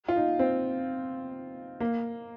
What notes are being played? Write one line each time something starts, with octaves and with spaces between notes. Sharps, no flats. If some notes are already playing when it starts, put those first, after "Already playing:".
F4
D#4
C4
A#3